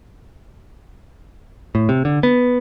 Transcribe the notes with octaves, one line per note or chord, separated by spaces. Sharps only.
A2
C3
D3
B3